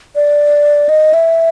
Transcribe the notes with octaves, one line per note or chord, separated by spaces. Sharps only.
D5
D#5
E5